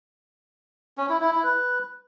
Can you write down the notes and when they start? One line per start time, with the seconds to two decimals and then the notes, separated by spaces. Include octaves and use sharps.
0.98 C#4
1.09 E4
1.21 E4
1.32 E4
1.44 B4